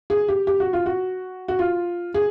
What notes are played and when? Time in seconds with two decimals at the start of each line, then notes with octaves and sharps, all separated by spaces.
0.10 G#4
0.29 G4
0.47 G4
0.60 F#4
0.73 F4
0.86 F#4
1.48 F#4
1.59 F4
2.14 G#4